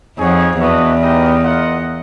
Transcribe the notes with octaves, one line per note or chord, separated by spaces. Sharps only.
F2 D#4 G#4 C#5 F#5
E2 D4 F#4 B4 D#5
B3 D#4 G4 A#4 D#5
F4 A#4 D#5 F#5